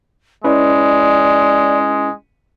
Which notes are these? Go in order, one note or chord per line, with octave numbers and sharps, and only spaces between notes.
G#3 C#4 E4 B4 D5